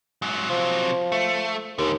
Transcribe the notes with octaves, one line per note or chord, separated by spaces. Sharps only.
G#2 F#3
C3 F3 F#3
A3
D#2 G#2 D3